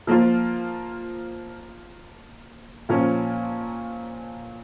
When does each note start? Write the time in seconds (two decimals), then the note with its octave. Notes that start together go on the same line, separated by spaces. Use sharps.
0.07 F3 A#3 F4
2.89 A#2 F3 A#3 C#4